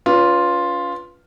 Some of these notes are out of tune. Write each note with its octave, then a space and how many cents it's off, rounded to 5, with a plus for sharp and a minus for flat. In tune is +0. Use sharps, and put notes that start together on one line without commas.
C#4 +40 F4 +0 B4 +0